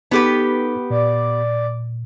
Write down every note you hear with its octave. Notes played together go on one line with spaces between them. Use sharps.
B3 D#4 G4 A4 B4
A#2 D5